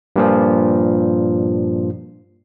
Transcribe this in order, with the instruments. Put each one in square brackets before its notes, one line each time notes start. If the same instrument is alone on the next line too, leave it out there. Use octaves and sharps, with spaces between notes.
[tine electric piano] G2 A#2 F3